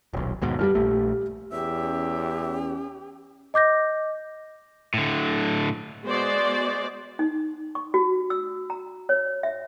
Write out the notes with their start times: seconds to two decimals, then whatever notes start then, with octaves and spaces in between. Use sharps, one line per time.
0.13 D#1 B1
0.42 D#2 G#2 B2
0.59 G2 E3 G3 G4 F6
0.75 A#1 A3
1.52 E2 C#4 G4 E5
3.54 D#5 D6 G6 A#6
4.94 A2 D3
6.05 G#3 B3 F#4 C5 D5
7.19 D#4
7.75 C#6
7.94 F#4
8.30 E6
8.70 A#5
9.09 C#5
9.43 E5